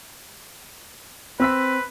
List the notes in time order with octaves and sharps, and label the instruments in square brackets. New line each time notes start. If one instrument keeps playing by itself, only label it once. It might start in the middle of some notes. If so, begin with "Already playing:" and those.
[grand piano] C4 E6 B6 [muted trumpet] B4